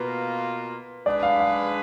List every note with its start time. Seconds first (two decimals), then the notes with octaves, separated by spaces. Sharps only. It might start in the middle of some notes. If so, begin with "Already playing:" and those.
Already playing: B2 A#3 F4 B4
1.06 G#3 D4 G#4 B4 D5
1.23 F5
1.40 F5